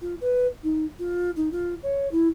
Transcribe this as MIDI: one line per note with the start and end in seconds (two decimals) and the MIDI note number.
0.01 0.15 65
0.21 0.47 71
0.63 0.85 63
0.99 1.31 65
1.36 1.49 63
1.52 1.75 65
1.83 2.08 73
2.11 2.28 64